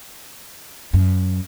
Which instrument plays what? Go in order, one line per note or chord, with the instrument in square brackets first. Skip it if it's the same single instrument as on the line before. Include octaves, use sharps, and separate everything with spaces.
[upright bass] F#2